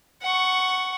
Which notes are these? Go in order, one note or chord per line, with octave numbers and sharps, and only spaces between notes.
F#5 C#6